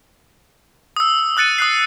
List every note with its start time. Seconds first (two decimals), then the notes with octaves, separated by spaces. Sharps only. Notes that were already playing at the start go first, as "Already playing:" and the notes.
0.96 D#6 E6
1.37 D#6 F#6 A6 C#7 D#7
1.58 D#6 F#6 C7